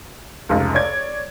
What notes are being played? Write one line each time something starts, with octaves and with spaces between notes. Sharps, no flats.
F1 C#2
C#5 D5 G#6